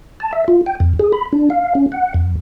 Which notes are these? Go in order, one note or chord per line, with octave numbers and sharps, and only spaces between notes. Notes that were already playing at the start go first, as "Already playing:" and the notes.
A5
E5
F4
G5
F2
G#4
B5
D4
F5
C#4
F#5
F2